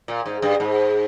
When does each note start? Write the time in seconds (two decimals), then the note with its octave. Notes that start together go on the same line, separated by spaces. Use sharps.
0.08 A#2
0.26 G#2
0.42 G2
0.60 G#2